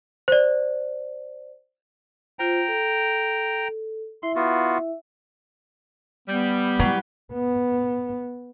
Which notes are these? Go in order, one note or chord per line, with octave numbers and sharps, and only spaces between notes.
C5 D5
F4 C5 G5 A#5
A4
E4 E5 C6
B3 F4 F#4
G3 B3
F#3 G#3 E4 G4 B4
B3